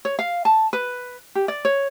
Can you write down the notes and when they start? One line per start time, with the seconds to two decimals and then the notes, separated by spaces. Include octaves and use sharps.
0.05 C#5
0.19 F5
0.45 A5
0.73 B4
1.35 G4
1.48 D5
1.65 C#5